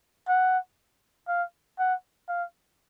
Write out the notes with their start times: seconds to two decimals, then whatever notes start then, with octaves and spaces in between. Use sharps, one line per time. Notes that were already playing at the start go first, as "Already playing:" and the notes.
0.28 F#5
1.28 F5
1.79 F#5
2.29 F5